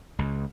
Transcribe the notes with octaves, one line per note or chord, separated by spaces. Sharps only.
C#2